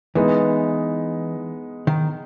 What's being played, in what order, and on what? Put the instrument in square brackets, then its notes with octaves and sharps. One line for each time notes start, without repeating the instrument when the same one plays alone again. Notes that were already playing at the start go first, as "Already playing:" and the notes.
[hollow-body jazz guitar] E3 [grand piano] G#3 B3 D#4
[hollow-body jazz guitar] D#3